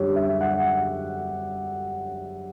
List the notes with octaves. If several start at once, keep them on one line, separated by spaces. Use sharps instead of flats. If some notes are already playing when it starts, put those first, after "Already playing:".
Already playing: F#2 D3 G3 G4 C#5
E5
F#5